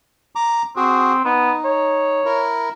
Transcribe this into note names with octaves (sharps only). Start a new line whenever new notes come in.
A#5 D6
C4 F#4 G#4
B3 D#4
C#5
E4 A#4